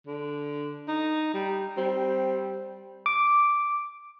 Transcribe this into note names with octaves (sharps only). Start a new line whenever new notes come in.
D3
D#4
G3
G3 C4
D6